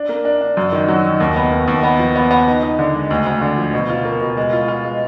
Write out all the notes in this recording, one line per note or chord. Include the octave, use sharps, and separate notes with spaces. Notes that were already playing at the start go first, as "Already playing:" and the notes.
Already playing: D4
A#3
D4
D4
F#2
D#3
F#3
D#3
D#2
B3
D#2
D#2
B3
F3
B3
B3
D#4
D#4
D3
G#3
D2
D2
D3
F3
B2
F4
A#3
B2
G#3
F4
F4
G#3